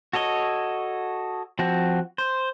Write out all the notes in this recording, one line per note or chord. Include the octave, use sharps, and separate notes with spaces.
F#4 A4 C#5 D#5
F3 C4 F#4
C5